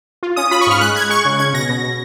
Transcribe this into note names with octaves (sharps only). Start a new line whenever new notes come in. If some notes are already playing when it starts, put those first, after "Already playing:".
F4
C#4 D#6
F4 B5
C#6
G#2 F6
G#3 F#6
G#3 G#6
G#3 C#6
C#3
C#4 G#6
B2 A#6
B2
B2